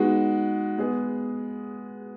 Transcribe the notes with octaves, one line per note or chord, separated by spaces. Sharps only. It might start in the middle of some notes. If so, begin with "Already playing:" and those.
Already playing: G#3 B3 D#4 F#4
G#3 B3 G#4